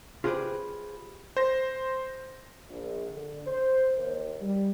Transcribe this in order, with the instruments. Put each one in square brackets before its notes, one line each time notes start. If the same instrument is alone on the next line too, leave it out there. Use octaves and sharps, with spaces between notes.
[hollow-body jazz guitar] F4 G4 G#4 B4 C5 D5
[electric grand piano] C5 A#6
[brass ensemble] A#1
D3
C5
D#2
G3